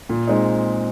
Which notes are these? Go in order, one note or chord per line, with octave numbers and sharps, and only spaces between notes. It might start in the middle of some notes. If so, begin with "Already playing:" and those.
A#2
G#3 C4 D#4